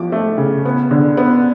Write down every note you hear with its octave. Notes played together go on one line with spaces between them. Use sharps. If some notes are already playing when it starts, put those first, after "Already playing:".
Already playing: F3 D6
A3
C#3
B3
D3
B3